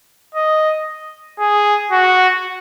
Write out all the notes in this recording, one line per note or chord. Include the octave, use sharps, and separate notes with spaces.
D#5
G#4
F#4